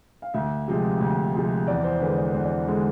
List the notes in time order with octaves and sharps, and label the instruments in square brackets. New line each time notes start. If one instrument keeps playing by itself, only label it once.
[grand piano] F5
D2 E5
C3 F3 G#3
D2
C3 F3 G#3
E2 D5
C5
D3 G#3 B4
D5
E2 C5
D5
D3 G#3